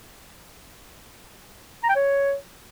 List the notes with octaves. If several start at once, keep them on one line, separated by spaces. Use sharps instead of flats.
A#5
G5
C#5